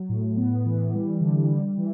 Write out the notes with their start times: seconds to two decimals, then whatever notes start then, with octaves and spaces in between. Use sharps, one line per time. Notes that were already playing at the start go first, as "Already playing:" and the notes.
Already playing: F#3
0.09 A2
0.37 B3
0.66 E3
0.94 G3
1.21 D3
1.49 G3
1.78 E3